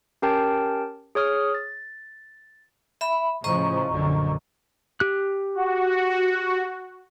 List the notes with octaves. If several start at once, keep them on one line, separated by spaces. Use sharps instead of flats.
C#4 G4 A#4 G5 A5
G#4 C#5 D#6 F6
A6
E5 B5
A2 C#3 F3 D#5 A#5 C#6
A#1 F#2 D3
G4 F#6
F#4